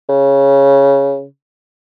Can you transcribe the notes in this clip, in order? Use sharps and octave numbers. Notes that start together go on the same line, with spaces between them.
C#3